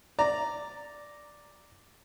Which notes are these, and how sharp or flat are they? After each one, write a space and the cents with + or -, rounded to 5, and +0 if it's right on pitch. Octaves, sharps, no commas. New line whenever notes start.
D5 +0 A#5 +0